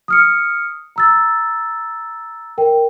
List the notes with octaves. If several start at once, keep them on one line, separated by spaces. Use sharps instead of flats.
D#6 F6 C#7
A#5 E6 A6
A#4 G5